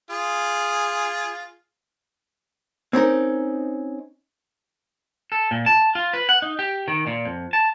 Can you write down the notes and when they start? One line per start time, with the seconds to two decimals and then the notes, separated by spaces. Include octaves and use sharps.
0.10 F4 G#4
2.93 C4 C#4 D#4 A#4
5.32 A4
5.51 A#2
5.66 A5
5.95 F4
6.13 B4
6.29 F#5
6.42 D#4
6.59 G4
6.88 D#3
7.07 A#2
7.25 F2
7.53 A5